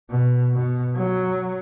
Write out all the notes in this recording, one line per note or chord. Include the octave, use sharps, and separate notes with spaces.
B2
B2
F#3